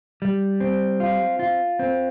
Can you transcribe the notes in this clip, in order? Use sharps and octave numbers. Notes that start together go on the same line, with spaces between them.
G3
C4
F4
F4
C4